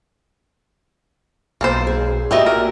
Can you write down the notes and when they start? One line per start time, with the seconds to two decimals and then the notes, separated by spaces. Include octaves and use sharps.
1.61 B1 A#3 A4 C5
1.87 G#4
2.31 A#2 A3 F#4 G4 D#5 E5
2.46 A#4